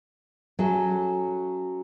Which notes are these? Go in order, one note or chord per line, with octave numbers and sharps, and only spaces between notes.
F#3 C#4 G#4 A4 E5